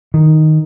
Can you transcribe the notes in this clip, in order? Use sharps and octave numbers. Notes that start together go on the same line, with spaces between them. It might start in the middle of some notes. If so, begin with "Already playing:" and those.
D#3